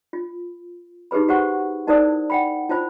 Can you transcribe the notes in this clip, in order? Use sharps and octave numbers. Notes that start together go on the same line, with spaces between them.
F4
D#4 G4 G#4 B4 B5
F#4 G4 C5 F#5 C#6
D#4 E4 A#4 C5 D5 D#6
F#5 G5 B5
E4 F4 C5 B5